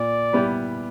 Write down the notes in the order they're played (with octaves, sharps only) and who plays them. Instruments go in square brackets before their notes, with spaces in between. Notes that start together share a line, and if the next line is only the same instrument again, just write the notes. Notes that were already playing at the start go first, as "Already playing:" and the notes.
Already playing: [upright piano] A#2 [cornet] D5
[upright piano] G3 B3 E4 G4